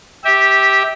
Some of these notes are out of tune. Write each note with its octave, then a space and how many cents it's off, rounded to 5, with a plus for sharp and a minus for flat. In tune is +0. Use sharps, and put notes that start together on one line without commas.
G4 +0 E5 -25